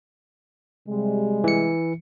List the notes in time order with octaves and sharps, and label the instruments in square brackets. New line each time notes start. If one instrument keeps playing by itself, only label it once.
[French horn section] C3 G3 G#3
[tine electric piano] E3 C#7